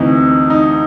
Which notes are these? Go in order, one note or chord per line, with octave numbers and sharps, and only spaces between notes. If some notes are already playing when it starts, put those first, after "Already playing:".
Already playing: D2 C3 E3 D#4
D#4